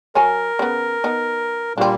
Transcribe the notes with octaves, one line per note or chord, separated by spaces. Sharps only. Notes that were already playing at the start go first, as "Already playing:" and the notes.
F#3 A#4 C#5 G#5
C#3 B3
B3 D#4
A#2 G3 A#3 C4 D4